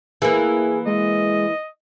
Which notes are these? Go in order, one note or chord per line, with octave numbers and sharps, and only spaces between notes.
E3 A#3 G#4
G#3 D#5